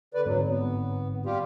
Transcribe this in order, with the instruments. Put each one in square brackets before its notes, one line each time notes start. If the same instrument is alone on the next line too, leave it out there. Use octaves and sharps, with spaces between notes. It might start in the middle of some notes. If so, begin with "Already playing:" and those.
[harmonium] D3 B4 D5
[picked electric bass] G1 G#2 C4 [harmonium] F#3
[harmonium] B3
G3 F4 G4